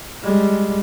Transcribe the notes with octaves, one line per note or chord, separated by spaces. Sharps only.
G3 G#3